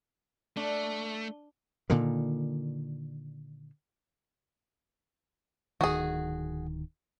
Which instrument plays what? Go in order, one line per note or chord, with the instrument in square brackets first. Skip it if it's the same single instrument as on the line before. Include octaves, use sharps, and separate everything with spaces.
[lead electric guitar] A3 [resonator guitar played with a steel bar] D4
[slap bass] A#2 D3 D#3
[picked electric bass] D1 D#3 [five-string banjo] F#4 G#4